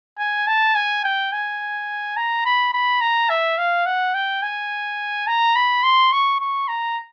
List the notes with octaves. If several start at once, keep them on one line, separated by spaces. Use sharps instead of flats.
G#5
A5
G#5
G5
G#5
A#5
B5
B5
A#5
E5
F5
F#5
G5
G#5
A#5
B5
C6
C#6
C#6
A#5